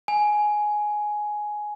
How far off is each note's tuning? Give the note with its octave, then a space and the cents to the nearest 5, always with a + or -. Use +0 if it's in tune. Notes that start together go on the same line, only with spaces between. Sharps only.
G#5 +10